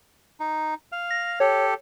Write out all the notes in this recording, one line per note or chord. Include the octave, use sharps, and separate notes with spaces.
D#4
F5
A#6
G4 A4 C#5